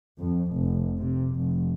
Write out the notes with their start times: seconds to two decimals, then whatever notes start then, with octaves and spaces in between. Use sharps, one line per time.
0.19 F2
0.55 F1
1.00 C3
1.37 F1